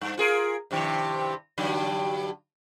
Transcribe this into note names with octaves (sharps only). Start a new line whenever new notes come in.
G2
F4 G#4 A#4
G2 C3 D#3
G2 D3 F#3